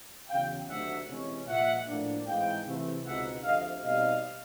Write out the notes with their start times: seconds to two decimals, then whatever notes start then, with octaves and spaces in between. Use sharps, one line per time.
0.29 E2 C#3 F#3 F5 G5
0.68 D2 C3 D#3 F#3 A3 E5 F#5
1.08 C3 E3 G#3 C#4
1.47 A#2 F3 G#3 E5 F#5
1.87 A2 F3 A#3 D4
2.26 G#2 E3 G#3 C4 D#4 F5 G5
2.65 C3 E3 A3
3.05 C#2 B2 G#3 C4 D#4 E5 F#5
3.44 D2 C3 F3 A3 D#5 F5
3.84 B2 G3 C4 D#4 D#5 F5